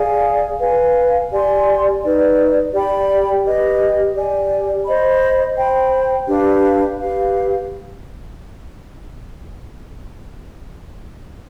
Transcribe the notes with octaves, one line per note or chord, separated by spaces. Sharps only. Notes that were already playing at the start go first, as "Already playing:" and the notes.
Already playing: G#4 D5 F5 G#5
B4 F5 G#5
G4 D5 G#5 C6
D#4 B4 D5
G4 D5 G5 B5
G4 B4 D#5
G4 D5 G#5
C5 D#5 B5
C5 G5 B5
D4 G4 B4 F5
G4 B4 F5